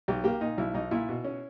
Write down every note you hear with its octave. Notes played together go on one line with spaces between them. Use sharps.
B1 G4
A#3 G4
A#2 D#4
B1 E4
B1 D#4
A#2 E4
B2
C#4